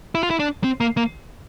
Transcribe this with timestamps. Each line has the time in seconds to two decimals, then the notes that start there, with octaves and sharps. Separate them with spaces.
0.15 E4
0.23 F4
0.30 E4
0.39 D4
0.64 C4
0.80 A#3
0.97 A#3